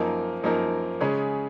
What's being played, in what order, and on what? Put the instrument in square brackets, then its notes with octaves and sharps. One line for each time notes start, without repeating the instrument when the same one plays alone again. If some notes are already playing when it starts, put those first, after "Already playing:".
Already playing: [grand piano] F#2 F3 A#3 D#4 A#4
F#2 F3 A#3 D#4 A#4
C#3 G#3 C#4 G#4 C#5